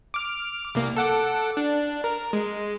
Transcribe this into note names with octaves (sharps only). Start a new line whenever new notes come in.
D6 F6
C2 A#3
A4 F#5 D6
D4
A#4
G#3